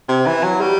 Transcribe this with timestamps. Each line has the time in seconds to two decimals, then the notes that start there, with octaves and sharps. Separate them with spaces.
0.09 C3
0.26 E3
0.43 F#3
0.61 G3